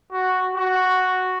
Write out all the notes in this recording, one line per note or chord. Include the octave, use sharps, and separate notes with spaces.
F#4
F#4